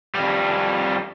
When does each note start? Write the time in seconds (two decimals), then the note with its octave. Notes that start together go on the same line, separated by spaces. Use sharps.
0.15 F2 G3